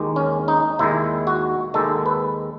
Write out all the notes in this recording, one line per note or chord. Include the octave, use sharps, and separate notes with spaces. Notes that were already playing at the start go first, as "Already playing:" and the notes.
Already playing: D#2 D#3 G#3
C#4
D#4
D#2 D#3 G#3 E4
F#4
D#2 D#3 G#3 A4
B4